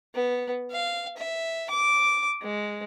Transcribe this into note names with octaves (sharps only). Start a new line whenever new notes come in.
B3
F5
E5
D6
G#3